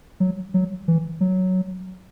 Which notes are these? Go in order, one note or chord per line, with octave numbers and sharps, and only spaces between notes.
F#3
F#3
E3
F#3